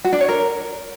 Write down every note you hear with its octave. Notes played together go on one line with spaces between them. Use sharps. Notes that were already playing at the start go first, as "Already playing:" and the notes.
F#4
D4
C#5
A#4